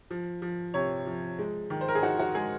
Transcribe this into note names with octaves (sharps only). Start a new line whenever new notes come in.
F3
F3
C3 C#5
F3
G#3
D#3
C5
A#4
G#4
D#4 F#4
F#4
G#3 G#4